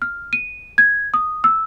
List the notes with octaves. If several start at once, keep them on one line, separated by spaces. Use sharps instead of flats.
F6
D#7
G#6
D#6
E6